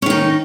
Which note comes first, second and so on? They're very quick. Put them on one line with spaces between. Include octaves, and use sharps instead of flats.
C#4 D#3 D#4